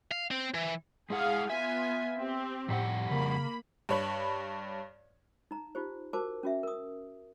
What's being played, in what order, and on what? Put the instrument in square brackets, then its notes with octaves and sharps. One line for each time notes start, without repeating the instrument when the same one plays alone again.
[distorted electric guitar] F5
C4
E3
[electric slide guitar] G#3 E4 F#5 [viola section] G#4 F5
[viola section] B3 F4 G#5 [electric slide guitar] E5
[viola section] C4 G4
[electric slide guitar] F2 G3 F#5 [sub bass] A2
[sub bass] C#3 [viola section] A#3 B5
[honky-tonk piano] G2 C#5 B5
[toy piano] D#4 A#5
D#4 F4 G4 C5
F#4 A#4 C5 A5 D6
C#4 F#4 E5
A#4 D#6